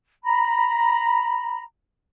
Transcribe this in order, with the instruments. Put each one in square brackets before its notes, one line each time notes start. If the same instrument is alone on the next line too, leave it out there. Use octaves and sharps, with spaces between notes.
[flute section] A#5 B5